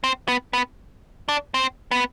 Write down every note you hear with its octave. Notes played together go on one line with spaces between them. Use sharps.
C4
B3
B3
D4
C4
B3